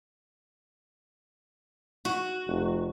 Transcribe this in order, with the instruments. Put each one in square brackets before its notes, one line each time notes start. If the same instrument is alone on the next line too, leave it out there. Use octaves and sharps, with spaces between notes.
[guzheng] F#4
[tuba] F1